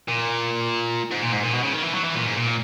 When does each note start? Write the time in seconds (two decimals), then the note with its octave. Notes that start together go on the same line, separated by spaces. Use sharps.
0.08 A#2
1.11 G#2
1.22 A#2
1.33 G#2
1.43 A#2
1.53 B2
1.63 C#3
1.73 D#3
1.84 E3
1.94 F#3
2.04 E3
2.15 A#2
2.25 G#2
2.36 A#2